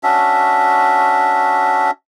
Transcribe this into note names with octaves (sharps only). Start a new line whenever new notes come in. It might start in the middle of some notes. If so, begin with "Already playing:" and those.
C#4 D4 F#4 E5